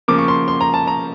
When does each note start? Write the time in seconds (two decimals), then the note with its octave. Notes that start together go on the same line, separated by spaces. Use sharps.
0.08 C#3 F3 A#3 D6
0.19 C#6
0.28 C6
0.48 C6
0.61 A#5
0.74 A5
0.87 A#5